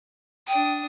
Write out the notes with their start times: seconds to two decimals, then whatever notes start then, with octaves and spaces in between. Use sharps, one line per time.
0.48 D4 G5 D#6